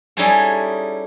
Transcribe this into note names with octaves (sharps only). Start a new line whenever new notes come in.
G3 C#4 D#4 E4 G#4 A4